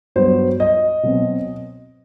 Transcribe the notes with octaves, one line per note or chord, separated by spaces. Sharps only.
G2 F#3 B3 C5
D#5
B2 F#3 C4